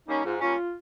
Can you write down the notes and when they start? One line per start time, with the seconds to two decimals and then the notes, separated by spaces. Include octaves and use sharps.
0.08 G3 A#3 C#4 D#4
0.24 G#2 F4
0.41 G3 A#3 C#4 F4